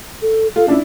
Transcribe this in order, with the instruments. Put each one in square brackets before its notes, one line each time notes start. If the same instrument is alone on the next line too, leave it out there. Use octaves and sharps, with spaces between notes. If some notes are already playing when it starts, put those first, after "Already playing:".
[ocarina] A4
[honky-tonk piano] F4 [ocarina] A4
[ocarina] C#4 [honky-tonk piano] D4 E4